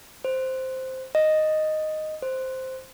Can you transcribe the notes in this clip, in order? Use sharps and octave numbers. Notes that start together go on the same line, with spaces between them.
C5
D#5
C5